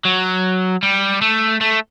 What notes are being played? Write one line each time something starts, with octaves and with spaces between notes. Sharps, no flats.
F#3
G3
A3
A3